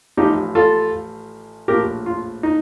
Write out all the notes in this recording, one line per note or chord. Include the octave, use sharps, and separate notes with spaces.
A1 A2 F3 D#4 G4
F4 A4
A#1 A2 F3 G4 A#4
F4
D#4